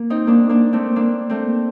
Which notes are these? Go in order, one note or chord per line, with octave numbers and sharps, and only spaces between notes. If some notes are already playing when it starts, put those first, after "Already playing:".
Already playing: A#3
C4 D#4
A#3 D4
A#3 D4
A3 C4
A#3 D4
A3 C4